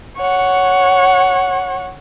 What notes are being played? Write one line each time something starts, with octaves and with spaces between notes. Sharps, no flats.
C#5 F#5